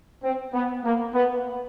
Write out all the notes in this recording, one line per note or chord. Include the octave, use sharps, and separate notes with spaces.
C4
B3
A#3
B3